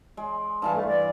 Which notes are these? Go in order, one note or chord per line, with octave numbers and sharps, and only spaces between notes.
G#3
G2 E3 F5 A5
A3
D5